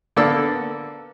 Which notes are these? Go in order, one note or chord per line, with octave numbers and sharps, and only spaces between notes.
D3 A#3 B3 A4 D5 E6